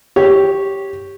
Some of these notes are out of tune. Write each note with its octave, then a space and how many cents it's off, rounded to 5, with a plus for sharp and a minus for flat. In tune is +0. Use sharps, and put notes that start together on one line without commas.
G4 -5 C#5 +0